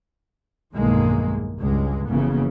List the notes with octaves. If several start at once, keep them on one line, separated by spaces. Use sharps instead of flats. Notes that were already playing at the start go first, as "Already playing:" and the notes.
B1 E2 G2 D#3 G#3 A#3
C#2 G2 G#3
F#1 F2 C#3 E3 A#3 B3